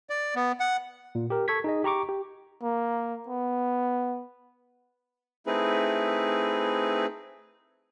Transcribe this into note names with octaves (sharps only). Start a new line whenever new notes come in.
D5
B3
F#5
A#2
G4 A#4
A4 C#6 G#6 B6
D#4 G#4 D#5
G4 A#5 C#6 D6
G4
A#3
B3
A3 C4 D#4 E4 G#4 B4